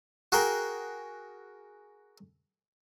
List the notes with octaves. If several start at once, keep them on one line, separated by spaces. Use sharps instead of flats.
F#4 G#4 A#4 G5